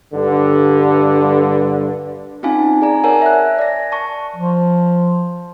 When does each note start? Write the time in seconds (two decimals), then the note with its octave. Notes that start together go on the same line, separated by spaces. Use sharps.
0.14 G2 D3
2.43 C4 C#4 D#4 F4 F5 G#5
2.82 G#4 D5 G#5 A#5
3.04 A#4 C#5 D5 F#5 G#5 A5
3.22 E5 F#6
3.59 D5 A#6
3.92 A5 C#6
4.34 F3